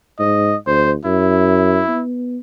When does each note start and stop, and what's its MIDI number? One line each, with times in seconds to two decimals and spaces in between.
0.19 0.54 44
0.19 0.56 75
0.67 0.96 38
0.67 0.91 72
1.05 1.83 42
1.05 2.02 64
1.89 2.39 59